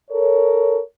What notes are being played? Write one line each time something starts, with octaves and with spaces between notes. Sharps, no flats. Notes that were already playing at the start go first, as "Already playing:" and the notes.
A4 A#4 C#5